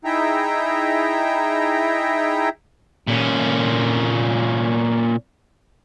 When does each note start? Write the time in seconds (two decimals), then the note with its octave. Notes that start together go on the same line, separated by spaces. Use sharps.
0.05 D#4 E4 G#4 E5 G5 A#5
3.08 A#2 C#4